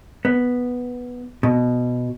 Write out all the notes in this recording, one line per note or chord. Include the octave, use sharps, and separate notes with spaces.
B3
B2